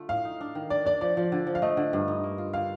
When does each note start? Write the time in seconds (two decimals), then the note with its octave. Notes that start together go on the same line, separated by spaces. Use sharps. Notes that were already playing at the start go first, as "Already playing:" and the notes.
Already playing: D3 A3 F4
0.09 A2 F5
0.25 D#4
0.41 D4
0.55 D#3
0.70 D4 D5
0.85 D4 D5
1.01 F3 D5
1.17 F3
1.32 D3
1.47 F3
1.55 F5
1.62 A3 D#5
1.77 D3
1.93 G2
2.08 D#4
2.23 A#3
2.38 F4
2.54 D3 F5